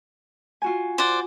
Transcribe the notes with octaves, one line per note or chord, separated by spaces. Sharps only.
F4 F#4 G#5
C5 D5 F#5